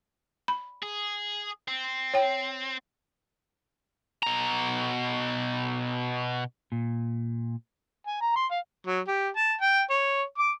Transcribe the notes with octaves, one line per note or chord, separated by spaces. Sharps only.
B5
G#4
C4
C#5 G5
B2 A#5
A#2
G#5
A#5
C6
F5
F#3
G4
A5
G5
C#5
D6